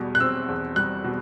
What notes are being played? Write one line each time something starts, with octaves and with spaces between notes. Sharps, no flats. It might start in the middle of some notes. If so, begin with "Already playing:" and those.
Already playing: E2 B2 G3
F#6
C4 E6
E2
G3 F#6
B2